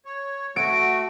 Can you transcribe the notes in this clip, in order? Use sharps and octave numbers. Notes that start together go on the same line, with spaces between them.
C#5
A3 F#4 D7